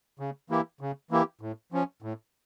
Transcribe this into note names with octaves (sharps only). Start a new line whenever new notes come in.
C#3
E3 A#3 E4 G4
C#3
E3 A#3 E4 G4
A2
F3 C#4
A2